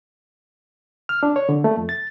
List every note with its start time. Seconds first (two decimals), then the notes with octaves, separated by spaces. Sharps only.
1.09 F6
1.23 D4
1.36 C#5
1.49 D3
1.64 A3
1.77 F2
1.89 A6